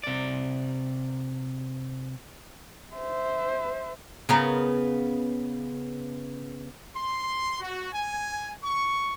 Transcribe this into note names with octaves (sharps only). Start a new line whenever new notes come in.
C3 D5
C5 E5
C#3 B3 A#4
C6
F#4
G#5
C#6